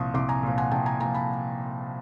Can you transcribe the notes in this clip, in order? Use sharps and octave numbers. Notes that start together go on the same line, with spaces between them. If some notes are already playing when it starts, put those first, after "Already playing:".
Already playing: C2 A#2 F3 C6 C#6 D#6
C2 C6 D6
G#5 A#5
A#2 F3
F#5 G#5
C2 G5 A5
G#5 A#5
A#2 F3 G#5 A#5
A5 B5